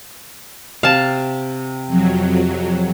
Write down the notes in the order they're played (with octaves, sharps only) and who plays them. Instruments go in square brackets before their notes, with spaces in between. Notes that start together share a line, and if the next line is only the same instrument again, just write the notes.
[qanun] C3 [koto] F5 A5
[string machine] F2 F#3